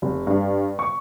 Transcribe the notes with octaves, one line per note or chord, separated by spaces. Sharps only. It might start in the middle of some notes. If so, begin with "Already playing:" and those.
F1
G2
C#6